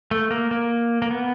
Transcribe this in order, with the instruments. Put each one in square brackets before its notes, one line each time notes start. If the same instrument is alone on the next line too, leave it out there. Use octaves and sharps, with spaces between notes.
[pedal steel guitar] A3
A#3
A#3
A#3
B3